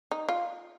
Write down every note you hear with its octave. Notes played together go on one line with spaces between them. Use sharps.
D#4
F4